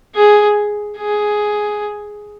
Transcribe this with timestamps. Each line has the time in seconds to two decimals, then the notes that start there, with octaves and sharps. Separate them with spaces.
0.15 G#4
0.97 G#4